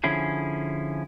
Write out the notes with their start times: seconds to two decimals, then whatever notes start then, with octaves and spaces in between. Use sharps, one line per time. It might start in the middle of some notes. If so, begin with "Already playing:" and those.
0.04 D3 F3 C#4 E4 G#4